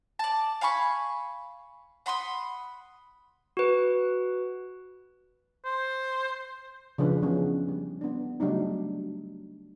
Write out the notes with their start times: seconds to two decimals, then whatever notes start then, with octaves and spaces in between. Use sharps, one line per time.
0.19 D5 A5
0.61 F5 G#5 B5 C#6
2.06 F#5 B5 C6 D#6
3.57 F#4 B4
5.65 C5
6.98 C#3 F3 D4 B4
7.22 E3 F3 B3 C#4 G#4
7.68 G3
8.01 B3 D4
8.40 C#3 F#3 G3 A3 D4 D#4